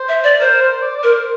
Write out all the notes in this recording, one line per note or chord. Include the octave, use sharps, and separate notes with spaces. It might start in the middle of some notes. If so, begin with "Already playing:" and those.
Already playing: C5
E5
D5
A#4 C5
C5
D5
D5
A#4 C5